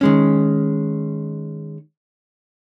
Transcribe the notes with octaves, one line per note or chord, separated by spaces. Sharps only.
D#3 G#3 C#4